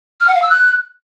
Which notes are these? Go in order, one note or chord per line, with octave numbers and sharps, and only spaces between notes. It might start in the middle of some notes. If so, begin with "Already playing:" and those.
F6
F#5
F5
E6
F#6